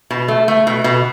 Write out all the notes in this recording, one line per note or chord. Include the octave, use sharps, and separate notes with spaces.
B2
A3
A3
B2
B2